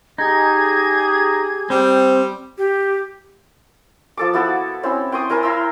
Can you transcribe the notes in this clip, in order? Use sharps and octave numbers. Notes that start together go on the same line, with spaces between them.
D#4 G4 G#4 G#6
G3 C4
G4
F3 A4 D6
B3 E4 F#4 A4
C4 C#4 E4
G5 C6 C#6 D#6
E4 A#4 C5 G#5
E4 A#5 C6 E6